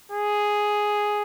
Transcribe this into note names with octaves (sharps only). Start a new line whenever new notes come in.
G#4